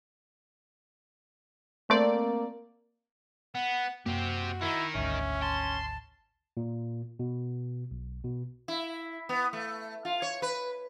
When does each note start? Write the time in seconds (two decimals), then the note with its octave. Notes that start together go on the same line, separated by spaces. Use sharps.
1.90 A3 A#3 C4 D5
3.55 B3 F#5
4.06 F#2 A#3 C4 F#4 G4
4.61 D#3 D#4 E4
4.95 G#1 D2 C#4 E5
5.42 A5 C6
6.57 A#2
7.19 B2
7.91 B1
8.24 B2
8.68 E4
9.29 B3
9.53 A3
10.05 F4
10.22 C#5
10.42 B4